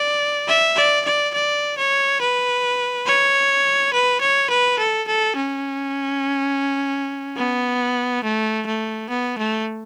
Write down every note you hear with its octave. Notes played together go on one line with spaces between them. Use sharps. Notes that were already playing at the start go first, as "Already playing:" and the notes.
Already playing: D5
E5
D5
D5
D5
C#5
B4
C#5
B4
C#5
B4
A4
A4
C#4
B3
A3
A3
B3
A3